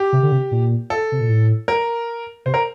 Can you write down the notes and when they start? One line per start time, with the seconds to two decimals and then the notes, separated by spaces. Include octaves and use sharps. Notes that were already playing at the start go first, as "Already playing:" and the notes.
Already playing: G4
0.13 C3
0.23 D3
0.32 C3
0.51 A#2
0.90 A4
1.12 C3
1.20 A#2
1.29 A2
1.68 A#4
2.45 C3 C5
2.54 A#4